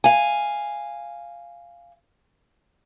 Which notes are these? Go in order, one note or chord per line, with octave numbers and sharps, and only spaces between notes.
F5 G#5